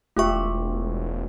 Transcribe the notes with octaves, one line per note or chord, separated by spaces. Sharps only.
E1 A3 F4 G4 E5 C#6